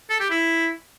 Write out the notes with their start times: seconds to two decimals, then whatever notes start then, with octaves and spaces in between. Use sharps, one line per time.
0.10 A4
0.20 G4
0.30 E4